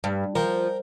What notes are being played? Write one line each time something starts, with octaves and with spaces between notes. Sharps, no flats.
G2
F3 A#4 G5